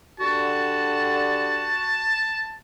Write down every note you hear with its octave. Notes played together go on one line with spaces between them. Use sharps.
D3 F#4 G4 A5